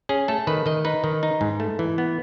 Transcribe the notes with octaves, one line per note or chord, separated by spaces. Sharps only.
C#4 G#4
A3 A4
D#3 B4
D#3 D#5
D#4 B4
D#3
D#4
G#2
A3
E3
B3